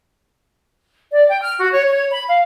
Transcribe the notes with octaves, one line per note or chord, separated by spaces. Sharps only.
D5
G5
F6
F#4
C#5
C#5
B5
F5